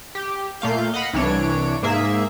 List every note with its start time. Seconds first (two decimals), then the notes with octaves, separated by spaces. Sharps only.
0.15 G4
0.61 A#2 A3 F5 G6
0.94 D#5 F5 F#5 B5
1.13 C2 E3 D4 C#5 D7
1.83 G#2 A#3 G#4 E5